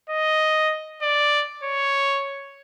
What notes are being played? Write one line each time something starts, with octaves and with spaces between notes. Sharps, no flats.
D#5
D5
C#5